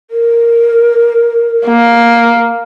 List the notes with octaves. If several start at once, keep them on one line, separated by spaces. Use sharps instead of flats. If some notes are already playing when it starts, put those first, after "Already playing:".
A#4
A#3